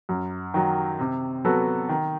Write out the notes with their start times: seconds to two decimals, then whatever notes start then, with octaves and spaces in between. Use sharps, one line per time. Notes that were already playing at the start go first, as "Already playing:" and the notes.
0.09 F#2
0.54 D#3 F#3
1.00 C3
1.45 F#3 B3 F#4 A4
1.89 D#3